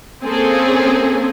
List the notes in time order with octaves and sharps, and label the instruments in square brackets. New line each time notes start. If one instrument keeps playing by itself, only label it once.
[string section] A#3 C4 C#4 G#4 A4